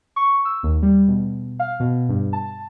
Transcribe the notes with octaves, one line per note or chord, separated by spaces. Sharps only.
C#6
E6
D#2
G3
B2
F5
B2
G2
A5